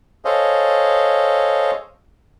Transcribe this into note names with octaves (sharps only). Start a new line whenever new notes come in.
G#4 A4 C5 C#5 D#5 F5